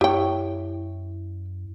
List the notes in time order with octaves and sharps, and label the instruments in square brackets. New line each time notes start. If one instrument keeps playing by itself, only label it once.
[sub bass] F#2 [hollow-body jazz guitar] E4 C#5 [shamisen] G4 G5